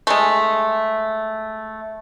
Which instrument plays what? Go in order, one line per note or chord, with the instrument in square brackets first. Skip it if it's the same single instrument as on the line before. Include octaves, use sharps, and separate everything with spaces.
[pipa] G#3 A3